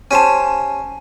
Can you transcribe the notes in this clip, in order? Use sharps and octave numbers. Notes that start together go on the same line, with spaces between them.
C#4 G4 C5 G#5 A5